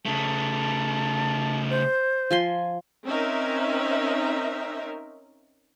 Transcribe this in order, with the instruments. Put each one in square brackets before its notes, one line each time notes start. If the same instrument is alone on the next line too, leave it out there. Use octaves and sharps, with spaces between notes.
[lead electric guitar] C#3 A3 [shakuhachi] A5
[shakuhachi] C5
[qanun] F3 G#5 C6
[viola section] C4 C#4 D#4 A#4 E5